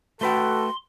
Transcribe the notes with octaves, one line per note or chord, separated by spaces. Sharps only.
A3 F#4 A4 B4 G5 C6